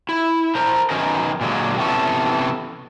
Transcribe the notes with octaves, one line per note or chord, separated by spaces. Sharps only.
E4
A#4 C5 A#5
D#3 F#3 C#4 D#4 A#4 B4
A#2 D3 F#3 G#3
C3 E3 B3 C#4 A4